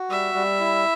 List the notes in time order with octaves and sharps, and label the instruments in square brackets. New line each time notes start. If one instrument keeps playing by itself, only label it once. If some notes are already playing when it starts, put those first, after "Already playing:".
Already playing: [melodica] F#4
[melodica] G3 [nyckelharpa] E5
[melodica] G3
E4